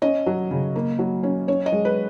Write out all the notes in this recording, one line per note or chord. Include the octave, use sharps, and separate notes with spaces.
C#4 D#5
F#3
C#3
A#3
F#3
C#4
C#4 C#5
D#5
G#3
B4